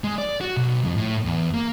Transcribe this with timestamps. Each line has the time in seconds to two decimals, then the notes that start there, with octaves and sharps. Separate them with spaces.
0.04 G#3
0.18 D5
0.41 F#4
0.57 B1
0.84 F2
0.97 A2
1.26 E2
1.54 A#3